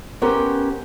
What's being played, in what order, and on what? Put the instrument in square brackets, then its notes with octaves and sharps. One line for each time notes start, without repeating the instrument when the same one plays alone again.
[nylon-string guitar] B3 C#4 G4 A#4 C5